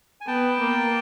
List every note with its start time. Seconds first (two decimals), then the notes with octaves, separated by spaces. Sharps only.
0.21 G#5
0.27 B3 G5 A5
0.60 A#3